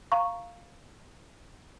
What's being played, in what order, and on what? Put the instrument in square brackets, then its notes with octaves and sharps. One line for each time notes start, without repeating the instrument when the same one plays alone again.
[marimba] F5 A#5 C#6